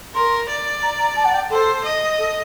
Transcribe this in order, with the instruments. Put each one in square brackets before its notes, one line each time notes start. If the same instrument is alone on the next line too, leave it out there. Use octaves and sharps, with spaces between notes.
[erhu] A#4 [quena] C6
[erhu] D5
[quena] A#5
A#5
A5
F#5
G5
[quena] A4 [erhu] C5
[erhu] D#5
[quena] A4